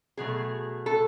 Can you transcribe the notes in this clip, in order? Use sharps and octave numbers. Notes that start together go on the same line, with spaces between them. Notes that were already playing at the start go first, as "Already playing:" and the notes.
B2 F#3 A3 G#4
A4